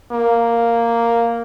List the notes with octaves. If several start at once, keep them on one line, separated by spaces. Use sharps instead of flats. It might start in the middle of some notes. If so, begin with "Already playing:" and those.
A#3